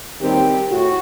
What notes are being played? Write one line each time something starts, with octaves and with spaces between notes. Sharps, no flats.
D#2 D#3 G3 C4 G4
A2 F#4